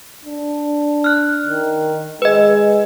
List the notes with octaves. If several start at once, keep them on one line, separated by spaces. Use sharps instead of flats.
D4
F6 F#6
D#3
G#3 B4 D#5